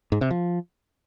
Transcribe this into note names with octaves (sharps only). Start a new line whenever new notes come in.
G#2
C3
F3